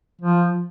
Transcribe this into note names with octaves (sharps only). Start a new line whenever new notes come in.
F3